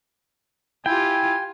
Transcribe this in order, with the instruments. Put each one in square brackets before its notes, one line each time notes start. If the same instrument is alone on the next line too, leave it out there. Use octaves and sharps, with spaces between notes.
[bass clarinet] E4 [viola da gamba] F4 G4 [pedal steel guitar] G5 [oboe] G#5